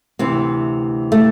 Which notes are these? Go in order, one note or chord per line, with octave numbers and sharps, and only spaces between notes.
D2 C3 E3 C4
A3